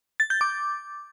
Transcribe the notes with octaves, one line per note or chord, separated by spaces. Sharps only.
A6
G6
D6